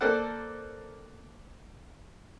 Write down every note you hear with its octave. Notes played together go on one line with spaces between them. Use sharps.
A#3 A4 C5 D5 F#5